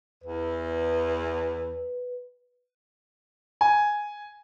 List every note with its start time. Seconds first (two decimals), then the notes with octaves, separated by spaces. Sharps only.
0.24 E2 B4
3.61 G#5